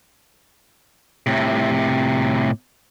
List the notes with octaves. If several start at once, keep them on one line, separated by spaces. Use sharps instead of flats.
A2 C3